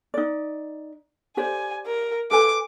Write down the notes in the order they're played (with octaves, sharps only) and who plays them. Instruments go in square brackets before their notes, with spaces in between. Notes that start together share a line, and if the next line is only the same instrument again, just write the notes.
[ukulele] D#4 D5
[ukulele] G4 C5 D5 [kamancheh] G#5
[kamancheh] A#4
[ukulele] A4 B4 G#5 [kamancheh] D6